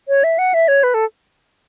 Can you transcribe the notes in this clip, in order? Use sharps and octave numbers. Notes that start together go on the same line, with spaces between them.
C#5
E5
F#5
E5
C#5
B4
A4